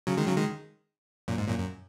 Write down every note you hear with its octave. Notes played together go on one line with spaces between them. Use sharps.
C#3 F#3
D#3 G#3
C#3 F#3
D#3 G#3
F#2 A#2
G#2
F#2 A#2
F#2